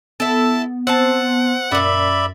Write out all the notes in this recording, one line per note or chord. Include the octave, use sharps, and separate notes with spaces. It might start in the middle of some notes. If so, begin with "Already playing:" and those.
B3 E4 A4 A5
C4 C5 F#5 A5
F#2 A#2 C#3 D5 E5 B5